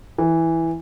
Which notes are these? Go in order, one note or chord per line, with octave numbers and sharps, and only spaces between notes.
E3